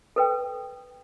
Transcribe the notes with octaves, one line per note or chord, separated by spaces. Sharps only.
A4 B4 G5